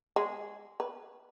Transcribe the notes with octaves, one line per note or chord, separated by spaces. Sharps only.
G#3
B4